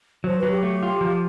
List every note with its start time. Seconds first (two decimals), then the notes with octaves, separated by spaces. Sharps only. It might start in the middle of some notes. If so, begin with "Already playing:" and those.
0.24 F#3 C5
0.37 B4
0.43 F#3
0.50 G4
0.63 A3
0.83 F4
1.01 F3